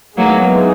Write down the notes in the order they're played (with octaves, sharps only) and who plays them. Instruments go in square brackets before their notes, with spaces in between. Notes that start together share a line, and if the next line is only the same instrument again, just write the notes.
[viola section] E3 G#3 B3 D#4 G#4 [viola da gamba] F#3 A#3